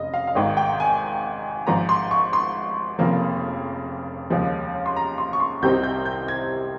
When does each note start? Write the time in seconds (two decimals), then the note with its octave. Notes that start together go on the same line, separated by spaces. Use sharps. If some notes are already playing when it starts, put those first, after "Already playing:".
Already playing: F1 C#3 D#5
0.14 F5
0.27 F5
0.35 G#1 G#2 D#3 G5
0.57 G5
0.80 G#5
1.67 G#1 G#2 F3 A#5
1.89 C6
2.11 C#6
2.33 C6
2.99 F1 F2 C#3 F3 A#3
4.30 D#2 C#3 F3 G#3
4.86 C6
4.96 A#5
5.18 C6
5.33 C#6
5.40 C6
5.62 C2 C3 G3 C4 D#4 G6
5.83 G6
6.05 G6
6.28 G#6